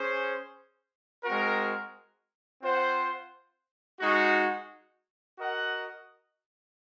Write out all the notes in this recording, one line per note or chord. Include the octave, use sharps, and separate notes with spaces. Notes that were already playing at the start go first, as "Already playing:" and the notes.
Already playing: C#4 G#4 C5
G#3 C4 F#4 A#4
C4 F4 C5 F#5
G#3 D#4 F#4
F#4 A#4 D#5 F#5